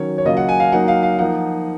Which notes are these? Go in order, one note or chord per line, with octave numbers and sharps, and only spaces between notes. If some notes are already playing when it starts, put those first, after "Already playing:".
Already playing: D#3 F#3 C#4 C#5
C#5
C#3 F#3 A#3 F4 D#5
F#5
G#5
F5
F#3 A#3 D#4 F#5
F5
F5
F3 A#3 D#4 F#5